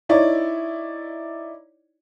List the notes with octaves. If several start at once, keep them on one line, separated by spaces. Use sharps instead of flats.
D#4 E4 C#5 D5